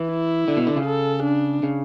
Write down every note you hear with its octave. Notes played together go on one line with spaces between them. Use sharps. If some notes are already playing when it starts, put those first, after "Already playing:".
Already playing: E3
E4
D3
B2
D3
C#3
A4
D4
C#3